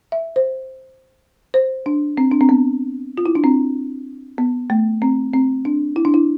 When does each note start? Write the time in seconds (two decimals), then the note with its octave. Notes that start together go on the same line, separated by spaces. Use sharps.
0.12 E5
0.36 C5
1.54 C5
1.86 D4
2.17 C4
2.32 D4
2.41 C4
2.49 B3
3.18 F4
3.26 E4
3.35 D4
3.44 C4
4.38 B3
4.70 A3
5.02 C4
5.34 C4
5.65 D4
5.96 E4
6.05 D4
6.14 E4